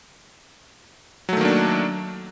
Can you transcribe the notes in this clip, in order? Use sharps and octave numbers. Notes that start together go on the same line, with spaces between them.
D#3 F#3 A3 A#3 D4